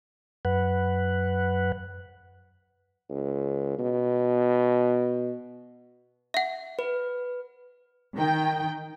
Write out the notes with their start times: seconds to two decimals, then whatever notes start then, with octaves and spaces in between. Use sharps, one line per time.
0.45 F#2 B4 F#5
3.09 C#2
3.79 B2
6.34 E5 F#5
6.79 B4
8.15 D#3 G5